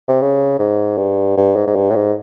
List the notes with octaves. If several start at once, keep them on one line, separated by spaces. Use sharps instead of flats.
C3
C#3
G#2
G2
G2
G#2
G#2
G2
A2
G#2